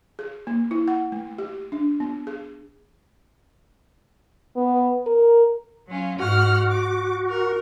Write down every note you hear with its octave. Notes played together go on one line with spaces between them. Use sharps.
G#4
A#3
E4
F#5
A3
G4
D4
B3
G#4
B3
A#4
F#3 C#4 F4
G#2 F#4 F#5 F6
D6
A#4